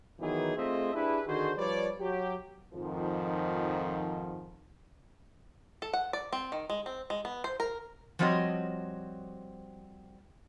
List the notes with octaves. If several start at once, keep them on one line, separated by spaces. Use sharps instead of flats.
D#3 E3 F#3 B3 D#4 G#4
A3 C4 F4 G#4 D#5 E5
D4 E4 G4 G#4 B4
D3 D#3 F#4 G#4 C5
F3 G3 B4 C#5 D5
F#3 G4
F2 G#2 D#3 F3
A4
F#5
D5
C4
D#3
G#3
C4
G#3
B3
C5
A#4
F3 G3 C4 F#4 C#5 D#5